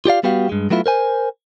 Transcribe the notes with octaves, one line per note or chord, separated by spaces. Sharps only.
F4 G4 D5 F5
G3 B3 F#4 G4 F5
G2 G#3
F#3 A3 B3 E4 F4
A#4 C5 G#5